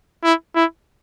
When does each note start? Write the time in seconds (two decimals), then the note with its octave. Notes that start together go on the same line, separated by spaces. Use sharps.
0.24 E4
0.55 E4